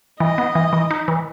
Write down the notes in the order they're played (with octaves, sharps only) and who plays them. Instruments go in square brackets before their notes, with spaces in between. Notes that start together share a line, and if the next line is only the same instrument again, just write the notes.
[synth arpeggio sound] E3 [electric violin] D#5
[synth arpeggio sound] B3
E3
E3
D#4
E3